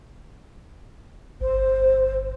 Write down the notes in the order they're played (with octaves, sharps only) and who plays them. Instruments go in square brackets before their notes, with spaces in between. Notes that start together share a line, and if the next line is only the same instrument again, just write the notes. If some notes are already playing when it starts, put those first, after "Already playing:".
[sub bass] G1 [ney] C5